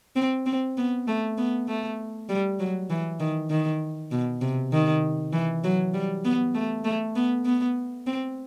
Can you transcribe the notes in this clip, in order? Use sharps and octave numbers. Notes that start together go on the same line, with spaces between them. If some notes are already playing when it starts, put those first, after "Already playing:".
C4
C4
B3
A3
B3
A3
G3
F#3
E3
D#3
D#3
B2
C3
D#3
E3
F#3
G3
B3
A3
A3
B3
B3
C4